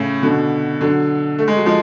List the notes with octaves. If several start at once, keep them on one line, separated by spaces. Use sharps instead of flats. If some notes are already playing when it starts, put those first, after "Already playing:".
Already playing: A2 C#3
B2 D3
D3 F#3
A3
G#3
F#3
F3 G#3